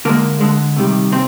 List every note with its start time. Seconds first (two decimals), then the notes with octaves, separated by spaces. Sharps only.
0.05 D3 F3 G#3 A#3
0.41 D3 G#3
0.76 C3 D#3 G3
1.12 C3 C4